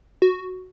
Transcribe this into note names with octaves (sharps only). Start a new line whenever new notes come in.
F#4